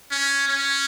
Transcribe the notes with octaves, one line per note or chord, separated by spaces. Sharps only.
C#4
C#4